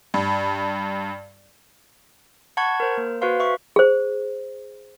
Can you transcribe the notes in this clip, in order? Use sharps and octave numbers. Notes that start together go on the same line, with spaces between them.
G2
F#5 A5 B5 C#6 G#6
A#4 C5
A#3
F#4 B4 C5 F5 C6
E5 C#6
G#4 C5